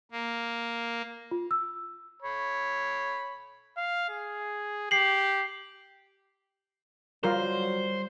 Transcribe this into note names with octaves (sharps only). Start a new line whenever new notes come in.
A#3
F4
E6
C#5 B5
F5
G#4
G4 C7 F#7
F#3 G3 F4 A#4 C5